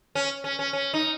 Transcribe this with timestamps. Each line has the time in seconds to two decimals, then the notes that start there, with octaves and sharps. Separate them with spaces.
0.15 C#4
0.44 C#4
0.59 C#4
0.73 C#4
0.94 D#4